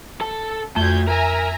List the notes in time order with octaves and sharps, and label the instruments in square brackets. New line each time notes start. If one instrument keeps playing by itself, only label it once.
[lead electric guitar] A4 A5
[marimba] F2 [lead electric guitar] A3 F#4 [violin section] G6 G#6
[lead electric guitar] A#4 [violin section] E5 G#5 A#5